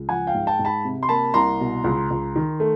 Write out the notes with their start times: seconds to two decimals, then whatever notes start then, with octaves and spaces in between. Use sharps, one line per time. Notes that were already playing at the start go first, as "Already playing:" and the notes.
Already playing: C#2
0.09 F3 F#5 G#5
0.27 F5 G5
0.35 G#2
0.47 G5 A5
0.59 G#2
0.65 A5 B5
0.85 C3
1.03 C6
1.09 A#3 A5 B5
1.34 C2 A#5 C6
1.60 B2
1.84 C#2
2.10 C#2
2.36 D#3
2.60 A3